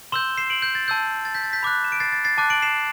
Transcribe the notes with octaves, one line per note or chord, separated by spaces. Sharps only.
C6 E6 G6 E7 G7
C7 E7
D7 F#7
G6
A6
A5 E6 G6
A6
G6 B6
A6
G6 B6
B5 D6 F#6
E7
D7
A6 C7
A6
A6 C7
A5 D6 F#6
D7 F#7
C7 E7